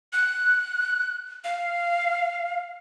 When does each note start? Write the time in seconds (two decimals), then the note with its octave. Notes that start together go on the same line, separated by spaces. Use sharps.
0.13 F#6
1.44 F5